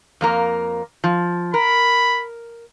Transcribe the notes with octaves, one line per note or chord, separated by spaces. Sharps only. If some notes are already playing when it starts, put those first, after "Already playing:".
F2 A#3 A#4
F3
A#4 B5